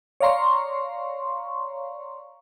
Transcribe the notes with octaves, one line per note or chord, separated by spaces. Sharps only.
C#5 D5 F5 A#5 C6 C#6